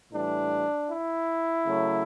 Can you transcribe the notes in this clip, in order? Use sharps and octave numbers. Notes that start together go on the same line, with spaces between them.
A2 E3 G3 D4
E4
C#3 F#3 A3